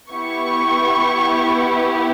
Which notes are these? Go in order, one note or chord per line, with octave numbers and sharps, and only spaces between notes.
B3 E4 G4 C#6